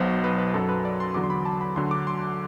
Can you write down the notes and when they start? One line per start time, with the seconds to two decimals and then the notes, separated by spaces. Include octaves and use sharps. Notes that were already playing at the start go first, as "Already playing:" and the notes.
Already playing: B1 B2 F#3 C5
0.24 B4
0.38 B4
0.54 F#2 F#3 A4
0.69 B4
0.85 D5
1.00 C6
1.14 E2 D3 F#3 D6
1.24 C6
1.30 B5
1.45 A5
1.61 B5
1.76 D2 D3 F#3 C6
1.91 D6
2.07 C6